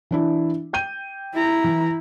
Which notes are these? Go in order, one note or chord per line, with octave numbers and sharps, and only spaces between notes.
E3 D4 E4
G5 G6 D#7
E4 A#5
E3